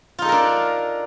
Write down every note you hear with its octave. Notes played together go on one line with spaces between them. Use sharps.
D4 D#4 F4 A4 A#4